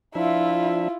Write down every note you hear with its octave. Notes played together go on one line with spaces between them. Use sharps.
F3 D4 E4 F4 E5